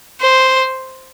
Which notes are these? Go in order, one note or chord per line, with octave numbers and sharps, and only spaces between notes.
C5